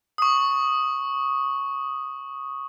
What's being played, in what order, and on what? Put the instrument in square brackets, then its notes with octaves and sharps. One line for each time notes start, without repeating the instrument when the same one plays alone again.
[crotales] C#6 D#6